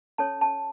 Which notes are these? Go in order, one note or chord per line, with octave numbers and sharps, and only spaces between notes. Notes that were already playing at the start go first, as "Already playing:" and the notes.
C#4 A4 C#5 A5
A5